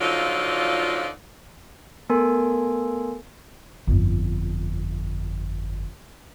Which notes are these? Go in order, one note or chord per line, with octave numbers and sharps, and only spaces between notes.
D3 F3 F#3 D#4 F4 D5
A3 B3 A4 A#4 G#5 C6
G1 F2